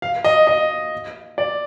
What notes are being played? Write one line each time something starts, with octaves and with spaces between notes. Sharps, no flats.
F5
D#5
D#5
D5